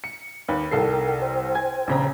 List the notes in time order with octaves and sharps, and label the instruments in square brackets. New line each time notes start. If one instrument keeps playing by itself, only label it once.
[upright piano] C#7
D#2 B4
[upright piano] C2 A4 C7 [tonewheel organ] A#4 G5
[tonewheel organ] C5 G5
[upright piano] G#5 G#6
A#1 C#3 A#5